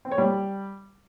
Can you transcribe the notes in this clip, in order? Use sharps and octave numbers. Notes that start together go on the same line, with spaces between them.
C4
C#5
G3